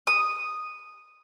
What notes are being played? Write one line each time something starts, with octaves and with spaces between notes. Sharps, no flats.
D#6